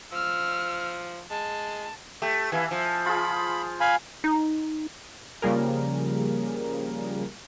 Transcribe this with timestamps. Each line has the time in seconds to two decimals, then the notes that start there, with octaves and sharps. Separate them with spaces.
0.12 F3 E6 F6
1.31 G#3 A5
2.22 A3 G4
2.52 E3 E5 F5 G#5
2.71 F3
3.06 F4 G#4 B5
3.81 F5 G#5 B5
4.24 D#4
5.42 C#3 F3 G3 A#3 G#4 A#4